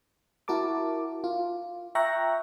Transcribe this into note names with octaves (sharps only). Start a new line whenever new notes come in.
E4 F#4 A#4 A5 D6
F4
E5 G5 A#5 C#6 F#6 A#6